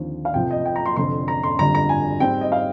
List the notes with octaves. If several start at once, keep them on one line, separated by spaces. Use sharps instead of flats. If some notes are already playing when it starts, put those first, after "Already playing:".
Already playing: D#2 D3 F3 C4
F5
F1 F2 C3 F3 G5
D#5
G5
A#5
C6
F1 F2 D3 C6
A#5
C6
G1 F2 D3 G3 A#5
A#5
G#5
G#2 G3 C4 G5
D#5
F5